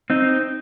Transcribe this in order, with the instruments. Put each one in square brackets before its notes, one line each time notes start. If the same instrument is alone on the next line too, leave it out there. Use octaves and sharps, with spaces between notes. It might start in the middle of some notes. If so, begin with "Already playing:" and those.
[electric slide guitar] C4 D#4